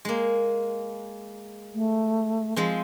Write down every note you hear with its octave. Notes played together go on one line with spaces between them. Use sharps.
G#3 A#3
A3
F3 G#3 C4